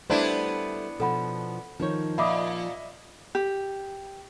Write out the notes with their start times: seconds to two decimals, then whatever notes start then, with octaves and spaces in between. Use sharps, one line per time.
0.10 G3 A3 B3 D4 E4 C5
1.00 B2 F3 A4 F#5 B5
1.80 D#3 F3 D#4 C#5
2.18 A#2 D#5 E5 B5 D6 D#6
3.35 G4